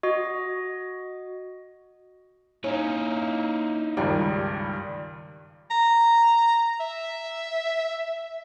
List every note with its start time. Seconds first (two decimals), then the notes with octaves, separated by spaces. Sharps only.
0.03 F#4 D#5
2.64 A#3 C#4 D#4 E4
3.97 C#2 G2 D#3 G3
5.71 A#5
6.80 E5